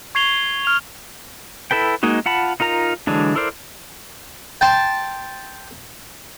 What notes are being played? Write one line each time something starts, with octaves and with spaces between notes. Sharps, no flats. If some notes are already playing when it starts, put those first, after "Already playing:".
C#6 G#6 C7 F7 G7
F6 F7
E4 A4 B4 G5
G#3 A#3 D#4 F#4
F4 F#5 A5 B5
D#4 F4 A#4 A#5
D3 E3 F#3 G#3 D4
E4 A4 A#4 C5 D5
G5 A5 C6